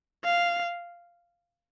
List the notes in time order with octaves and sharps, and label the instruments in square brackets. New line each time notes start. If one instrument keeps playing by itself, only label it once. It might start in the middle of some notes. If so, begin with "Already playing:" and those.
[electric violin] F5